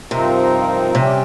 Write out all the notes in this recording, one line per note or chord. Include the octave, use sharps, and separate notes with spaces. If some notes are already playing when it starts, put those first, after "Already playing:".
G2 C3 F3 C4 D#4 A#4
C3 G3 C#4 G4